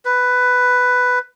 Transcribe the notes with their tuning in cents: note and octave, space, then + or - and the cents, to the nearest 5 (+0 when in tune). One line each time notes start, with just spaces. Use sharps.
B4 +10